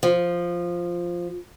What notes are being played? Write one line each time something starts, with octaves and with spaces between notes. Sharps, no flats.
F3